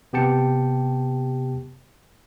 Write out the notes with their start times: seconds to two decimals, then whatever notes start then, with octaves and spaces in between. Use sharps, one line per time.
0.13 C3 B3 G4 G5 A5 C#7